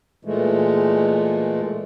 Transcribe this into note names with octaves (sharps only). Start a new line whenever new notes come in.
A#2 E3 G#3 A3